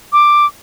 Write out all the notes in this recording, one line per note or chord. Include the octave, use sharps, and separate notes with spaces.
D6